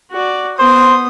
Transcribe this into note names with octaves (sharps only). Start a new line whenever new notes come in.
F#4 D5
B3 C5 D#6